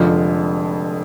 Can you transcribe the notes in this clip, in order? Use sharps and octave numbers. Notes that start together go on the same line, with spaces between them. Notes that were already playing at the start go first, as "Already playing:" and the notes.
Already playing: F1 F2 D3 F3 G#3